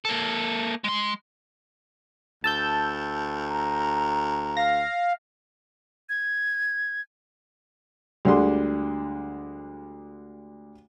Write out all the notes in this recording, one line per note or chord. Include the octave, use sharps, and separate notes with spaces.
A#3 A4
G#3 C6
D2 A5 E6 G6
A#5
F5 A#6
G#6
D2 D3 G3 G#3 D4 C6